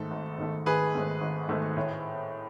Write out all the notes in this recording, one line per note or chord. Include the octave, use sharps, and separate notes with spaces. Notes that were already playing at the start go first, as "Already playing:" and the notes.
Already playing: G#2 D#3 A3 A4
G#1
G#2 D#3 A3
G#1 G#4 B4
G#2 D#3 A3
G#1
G#2 D#3 A3
A2